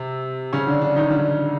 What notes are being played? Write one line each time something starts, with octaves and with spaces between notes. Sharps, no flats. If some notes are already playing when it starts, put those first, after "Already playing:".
Already playing: C3
C#3 C#4
D3 D4
D3 D4
D#3 D#4
D3 D4